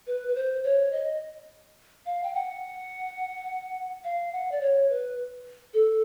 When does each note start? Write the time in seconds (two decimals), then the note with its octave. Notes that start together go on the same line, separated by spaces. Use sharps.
0.07 B4
0.28 B4
0.35 C5
0.64 C#5
0.92 D#5
2.06 F5
2.24 G5
2.34 F#5
4.04 F5
4.33 F#5
4.51 D5
4.61 C#5
4.90 B4
5.74 A4